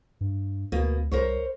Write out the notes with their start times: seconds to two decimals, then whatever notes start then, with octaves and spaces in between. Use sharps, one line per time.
0.21 G2
0.72 D2 B2 A#3
1.12 C2 A#4 C5 C#5